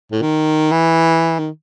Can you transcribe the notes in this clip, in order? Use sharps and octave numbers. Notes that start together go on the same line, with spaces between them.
A2
D#3
E3
D#3